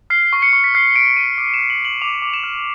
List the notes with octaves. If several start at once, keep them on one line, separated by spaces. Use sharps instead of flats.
F6 C7
C#6
C#7
C#6
B6
F6 C7
F6 D7
C#6 D#7
D6 D7
E7
F6
F#7
F6 F#7
D6 F7
D6
E7
F6